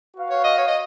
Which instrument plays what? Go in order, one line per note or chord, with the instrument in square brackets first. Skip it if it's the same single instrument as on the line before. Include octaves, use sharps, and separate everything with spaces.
[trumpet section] F#4 B4 F5
[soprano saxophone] C#5
D#5
C#5
D#5